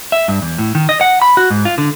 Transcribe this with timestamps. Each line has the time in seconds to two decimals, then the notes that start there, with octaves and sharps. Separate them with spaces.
0.12 E5
0.28 G2
0.42 E2
0.58 A2
0.75 D#3
0.89 D#5
1.01 F#5
1.22 B5
1.37 F#4
1.50 G#2
1.65 F4
1.78 D3